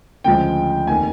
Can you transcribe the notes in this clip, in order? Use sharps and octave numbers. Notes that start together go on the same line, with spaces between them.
D2 C#3 F3 G#3 G5
F1 D#2 D#3 G#5